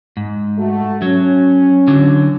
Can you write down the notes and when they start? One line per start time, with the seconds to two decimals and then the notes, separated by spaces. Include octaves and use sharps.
0.17 G#2
0.58 A3 F#4
1.02 F#3 C#4
1.87 D3 F#3